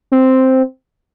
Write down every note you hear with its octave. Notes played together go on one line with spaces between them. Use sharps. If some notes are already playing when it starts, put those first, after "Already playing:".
C4